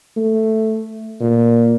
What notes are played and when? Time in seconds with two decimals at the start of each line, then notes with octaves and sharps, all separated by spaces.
0.17 A3
1.20 A#2